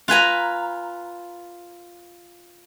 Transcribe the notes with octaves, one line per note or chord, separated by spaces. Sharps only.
F4 B4 G#5 A#5